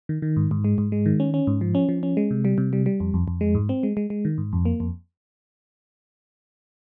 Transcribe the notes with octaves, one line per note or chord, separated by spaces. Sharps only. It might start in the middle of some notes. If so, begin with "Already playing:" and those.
D#3
D#3
G#2
G#2
G#3
G#2
G#3
D#3
C#4
C#4
G#2
F3
C#4
F3
C#4
G#3
C3
G3
C3
G3
G3
F2
F2
F2
G#3
G#2
C4
G#3
G#3
G#3
D#3
G#2
F2
A#3
F2